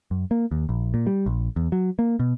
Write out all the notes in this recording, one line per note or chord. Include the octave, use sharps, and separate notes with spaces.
F#2
A#3
D#2
A#1
A#2
G3
A#1
E2
F#3
A#3
B2